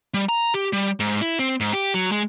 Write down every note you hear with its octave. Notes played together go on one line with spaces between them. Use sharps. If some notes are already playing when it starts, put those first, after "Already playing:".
G3
A#5
G4
G3
G#2
E4
C4
G#2
G4
F#3
G#3